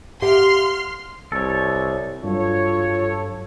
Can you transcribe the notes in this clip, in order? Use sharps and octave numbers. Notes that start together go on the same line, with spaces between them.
G4 F5 F#5 C6 F6
C2 A4 C#5
G2 F#3 F4 A4 C#5